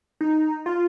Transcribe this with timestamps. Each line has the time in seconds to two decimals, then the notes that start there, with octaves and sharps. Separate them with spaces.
0.21 D#4
0.66 F4